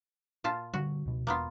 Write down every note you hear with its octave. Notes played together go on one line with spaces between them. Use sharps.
A#2 F4 A5
D3 G3 F#4
C#2 B2
E1 A#3 B3 F4